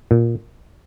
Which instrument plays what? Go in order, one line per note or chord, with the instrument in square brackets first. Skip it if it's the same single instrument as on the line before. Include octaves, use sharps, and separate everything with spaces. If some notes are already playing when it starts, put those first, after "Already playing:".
[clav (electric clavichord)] A#2